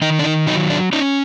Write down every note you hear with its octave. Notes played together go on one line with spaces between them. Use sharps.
D#3 D#4
D4
D#4
F#3 D#4
D4
C#4 D#4